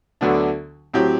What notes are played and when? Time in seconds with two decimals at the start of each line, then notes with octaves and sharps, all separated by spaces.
0.21 D2 D3 F#3 B3 D4
0.94 A2 F#3 C4 G4